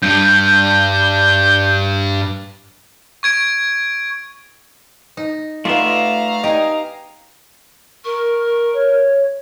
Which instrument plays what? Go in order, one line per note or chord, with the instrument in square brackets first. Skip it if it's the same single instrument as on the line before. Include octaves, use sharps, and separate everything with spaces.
[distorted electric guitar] G2 [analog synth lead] G6
[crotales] C#6 G#6 D7
[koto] D#4
[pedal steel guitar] A3 D5 E5 [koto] B3 D#4 [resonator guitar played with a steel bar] F4 [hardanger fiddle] F5 A#5
[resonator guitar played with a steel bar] D#4 [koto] G4 G#5
[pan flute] A#4 [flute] C#6
[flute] C#5